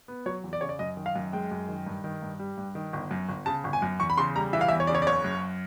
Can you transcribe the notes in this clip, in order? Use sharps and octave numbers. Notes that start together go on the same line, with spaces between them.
B3
F#3 C#5
E2
D5
C#3 C#5
D5
F#2 D#5
D#3
F5
F#2
G#3 G5
F#2
D#3
G2
D#3
G2
G3
G2
D#3
G1
F#2
G1
C#3 A5
G1
G#5
F#2
E2 C#6
B5
C#3 C6
G3 A#5
E3 E5
F5
E5
E2
C#5
C#3 D5
C#5
D5
F#1 C#5
F#2